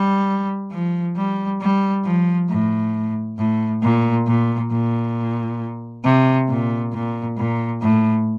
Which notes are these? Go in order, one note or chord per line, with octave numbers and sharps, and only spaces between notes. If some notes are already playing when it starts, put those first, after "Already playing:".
Already playing: G3
F3
G3
G3
F3
A2
A2
A#2
A#2
A#2
C3
A#2
A#2
A#2
A2